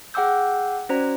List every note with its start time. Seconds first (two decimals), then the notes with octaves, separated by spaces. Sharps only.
0.14 G#4 F#5 G5 D6 E6 G6
0.89 C#4 F#4 C5 D5 A#5